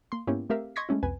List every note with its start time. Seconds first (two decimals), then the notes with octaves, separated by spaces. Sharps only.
0.12 A#3 C6
0.27 G#2 A#3 B3 C#4 E4 G4
0.50 A3 C4 G4 A#4 E5 F5
0.76 D#5 C6 C#6 G#6 A#6 B6
0.89 G#3 A3 C#4 E4
1.03 C2 F2 B4 G#5